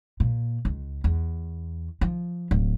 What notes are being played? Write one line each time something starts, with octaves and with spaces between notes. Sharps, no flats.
A#2
C#2
E2
F3
D1